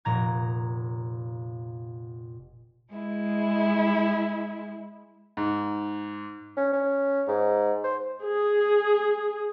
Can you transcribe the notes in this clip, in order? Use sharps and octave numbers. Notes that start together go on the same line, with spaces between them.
F1 A#2 A#5 G#6
G#3 E4
G#2
C#4
C#4
G#2
C5
G#4